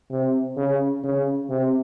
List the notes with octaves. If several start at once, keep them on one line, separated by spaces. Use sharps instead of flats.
C3
C#3
C#3
C3